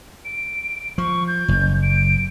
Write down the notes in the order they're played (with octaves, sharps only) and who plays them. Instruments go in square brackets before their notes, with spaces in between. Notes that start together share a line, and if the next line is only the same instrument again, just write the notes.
[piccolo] D7
[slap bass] F3 [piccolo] C#6
[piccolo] G6
[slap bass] F#1
[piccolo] D7